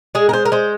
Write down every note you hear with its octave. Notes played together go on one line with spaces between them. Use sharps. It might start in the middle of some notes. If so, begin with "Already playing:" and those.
G#3 G#4
A#4
C5
A#4
G#3 C5